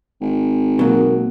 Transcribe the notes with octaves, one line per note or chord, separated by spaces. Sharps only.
G#1
B2 F#3 A#3